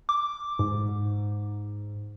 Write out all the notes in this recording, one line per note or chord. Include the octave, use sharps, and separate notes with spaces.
D6
G#2